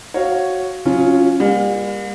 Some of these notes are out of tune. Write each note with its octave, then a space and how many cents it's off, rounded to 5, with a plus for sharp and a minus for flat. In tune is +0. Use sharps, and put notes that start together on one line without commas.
F#4 +5 C#5 +0 F5 +0
F#3 -30 C#4 +0 F4 +0
G3 +40 A#3 +30 F5 +45